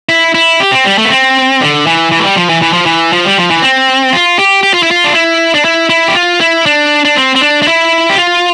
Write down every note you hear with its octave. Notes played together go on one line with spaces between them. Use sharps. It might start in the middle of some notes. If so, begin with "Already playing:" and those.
E4
E4
G4
C4
G3
A3
B3
C4
D3
E3
E3
A3
G3
F3
E3
E3
F3
E3
F3
G3
F3
E3
C4
F4
G4
G4
F4
E4
F4
D4
E4
D4
E4
E4
G4
F4
E4
D4
D4
C4
C4
D4
D4
E4
G4
F4